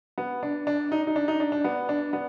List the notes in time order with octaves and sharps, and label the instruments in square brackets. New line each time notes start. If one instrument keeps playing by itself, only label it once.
[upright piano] B3
D4
D4
D#4
D#4
D4
D#4
D4
D4
B3
D4
B3